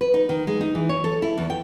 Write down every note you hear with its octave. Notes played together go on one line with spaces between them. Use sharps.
B4
D#4
D#3
G#3
D#4
E3
C#5
A4
E4
E2
G5